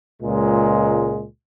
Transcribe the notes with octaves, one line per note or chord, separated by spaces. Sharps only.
C#2 A#2 G#3